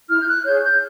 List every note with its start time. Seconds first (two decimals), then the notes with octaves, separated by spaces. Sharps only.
0.09 E4 F6
0.20 G6
0.26 F#6
0.44 G#4 C#5 G6
0.62 G6